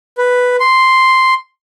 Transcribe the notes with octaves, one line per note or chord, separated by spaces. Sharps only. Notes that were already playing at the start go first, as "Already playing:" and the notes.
B4
C6